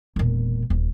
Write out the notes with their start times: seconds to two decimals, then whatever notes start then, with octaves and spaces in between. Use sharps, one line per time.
0.16 E1 A#2
0.70 D#1